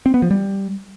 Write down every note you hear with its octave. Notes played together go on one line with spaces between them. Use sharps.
C4
B3
F3
G3